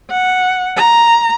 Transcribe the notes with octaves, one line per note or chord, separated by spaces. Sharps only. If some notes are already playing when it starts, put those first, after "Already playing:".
F#5
A#5